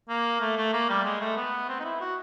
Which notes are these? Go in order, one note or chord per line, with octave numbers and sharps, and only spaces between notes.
A#3
A3
A3
A#3
G3
G#3
A3
B3
C4
D#4
E4
F#4